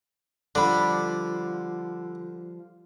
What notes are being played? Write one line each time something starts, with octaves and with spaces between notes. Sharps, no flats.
D3 F3 G3 D5 B5